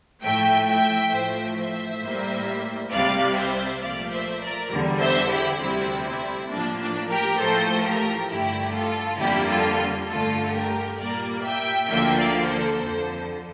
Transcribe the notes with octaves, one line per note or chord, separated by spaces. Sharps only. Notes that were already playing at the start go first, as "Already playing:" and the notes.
A2 F3 A3 E5 G5
E5 G5
A2 F3 A3 C5 E5
C5 E5
A2 G3 A#3
C2 C3 G3 D5 F5
C5 E5
A#2 F3 A3 D5 F5
C5 E5
A#4 D5
E2 D3 G3
C5 E5
E4 G4
D2 C3 G3 C4 E4
C4 E4
A2 F3 A#3 D4
D4
G4 A#4
A2 F3 A3 A4 C5
G4 A#4
G2 D3 A3 E4 G4
F4 A4
F2 D3 G3 A#3 E4 G4
F4 A4
G2 D3 A3 F4 A4
G4 A#4
A#2 G3 A#3 A#4 D5
E5 G5
D2 D3 F3 A#3 E5 G5
D5 F5
A4 C5
F2 D3 F3 A4 C5